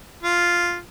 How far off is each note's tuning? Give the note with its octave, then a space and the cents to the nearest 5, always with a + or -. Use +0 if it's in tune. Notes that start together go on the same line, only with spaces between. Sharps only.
F4 +0